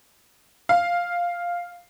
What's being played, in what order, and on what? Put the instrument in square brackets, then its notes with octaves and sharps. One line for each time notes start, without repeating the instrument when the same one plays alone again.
[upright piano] F5